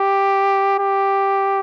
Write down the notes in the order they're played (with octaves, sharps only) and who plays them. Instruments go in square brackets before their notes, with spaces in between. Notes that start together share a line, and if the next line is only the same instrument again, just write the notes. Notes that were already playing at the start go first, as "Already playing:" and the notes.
Already playing: [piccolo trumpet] G4
G4